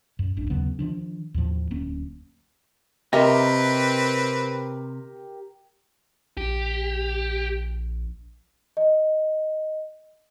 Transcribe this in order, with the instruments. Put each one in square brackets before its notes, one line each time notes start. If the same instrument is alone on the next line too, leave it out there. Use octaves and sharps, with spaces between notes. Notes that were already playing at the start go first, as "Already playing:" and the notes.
[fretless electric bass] F#2
D1 A1 D4
D#2 C#3 F#3 B3
D#3 F3 D4
D#2 A2 F3
D1 A#3 C#4
[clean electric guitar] C3 [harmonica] C4 B4 [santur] G4 A#4 [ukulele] D#5 E5
[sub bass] A#1 [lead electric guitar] G4
[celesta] D#5